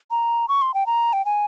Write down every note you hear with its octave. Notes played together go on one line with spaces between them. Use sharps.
A#5
C#6
C6
G5
A#5
G5
G#5